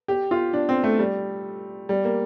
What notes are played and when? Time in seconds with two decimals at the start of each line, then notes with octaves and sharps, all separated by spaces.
0.08 G4
0.31 F4
0.53 D4
0.69 C4
0.84 A3
0.99 G3
1.89 G3
2.05 A#3